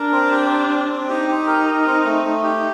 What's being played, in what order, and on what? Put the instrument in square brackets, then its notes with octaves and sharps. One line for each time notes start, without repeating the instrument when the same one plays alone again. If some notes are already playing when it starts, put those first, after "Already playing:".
Already playing: [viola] D4 [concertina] A#4
[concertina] C4
G4
C4
C4
C4
[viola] D#4 [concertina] G4
[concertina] G4
A#4
A#4
C4
A3
A3
G4